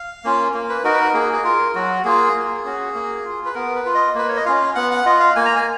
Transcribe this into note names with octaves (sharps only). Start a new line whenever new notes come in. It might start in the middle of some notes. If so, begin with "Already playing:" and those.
Already playing: F5
A#3 C#4 F4
A#3
B4
D#4 F#4 A#4
B4
A#4
A#3 G#4
G#4
F4 A#4
F#3 F#4
A#3 F4 G#4
A#3
C#4 F#4
A#3
F4
B4
B3 A#4
B4
F4
D#5
A#3 B4
C#5
D#5
C#4 F4 F5
B3 F#5
F#5
F4 D#5
F5
A#3 G#5
A#5
G#5